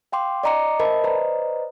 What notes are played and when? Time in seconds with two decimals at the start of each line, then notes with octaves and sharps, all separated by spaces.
0.12 F5 G5 C6 D6
0.43 D5 D#5 A#5 D6 C#7
0.80 A#4 C5 D#5 E5 A5 B5
1.04 B4 C5 D5 D#5 A#5